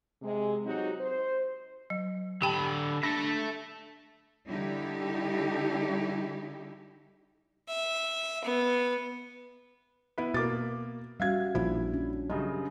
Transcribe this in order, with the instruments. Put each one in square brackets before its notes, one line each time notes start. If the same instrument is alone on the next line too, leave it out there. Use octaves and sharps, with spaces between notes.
[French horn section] C3 G#3
F#3 C4 D#4 F#4 G4
C5
[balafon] F#3
[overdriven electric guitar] D3 B5 [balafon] G4 G5 A5
[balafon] D4 [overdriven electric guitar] A4 E5
[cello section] D3 G3 D#4 E4 G4
[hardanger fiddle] E5
B3
[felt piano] B3 E4 B4
[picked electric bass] B2 [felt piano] A#3 D6 A6
[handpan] G3 C#4 F#4 [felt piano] E5 F5 G#6
[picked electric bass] A#1 A#2 F3 [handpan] D4 [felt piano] E4
[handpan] C#4 D4
[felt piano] F#2 C#3 G3 [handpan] D#5